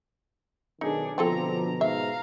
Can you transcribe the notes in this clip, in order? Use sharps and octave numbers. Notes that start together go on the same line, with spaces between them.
B1 D#3 D4 D#4 G#4
B2 D3 F3 C4 F4 A4 A#5
G#2 E5 F5 A#5